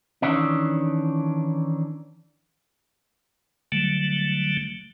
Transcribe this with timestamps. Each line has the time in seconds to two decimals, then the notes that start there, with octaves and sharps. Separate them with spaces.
0.22 D#3 E3 C#4 D4
3.72 D3 F#3 G3 A3